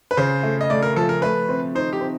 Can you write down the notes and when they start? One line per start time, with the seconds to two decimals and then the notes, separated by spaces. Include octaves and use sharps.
0.11 B4
0.17 C#3 C5
0.43 A3
0.61 D#5
0.70 A3 D5
0.82 A#4
0.96 F3 A4
1.09 A#4
1.22 A3 B4
1.49 C4
1.75 D#4 C5
1.93 G4
2.01 C4